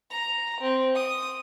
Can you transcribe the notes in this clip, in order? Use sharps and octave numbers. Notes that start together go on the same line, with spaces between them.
A#5
C4
D#6